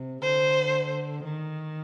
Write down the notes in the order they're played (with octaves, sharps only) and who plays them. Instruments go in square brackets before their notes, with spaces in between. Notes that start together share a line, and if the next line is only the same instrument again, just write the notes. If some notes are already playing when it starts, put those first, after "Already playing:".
Already playing: [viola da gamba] C3
[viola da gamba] D3 [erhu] C5
[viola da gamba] D#3